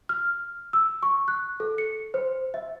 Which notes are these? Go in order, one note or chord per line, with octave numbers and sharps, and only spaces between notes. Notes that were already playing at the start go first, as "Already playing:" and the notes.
F6
E6
C#6
F#6
A4
C#7
C5
E5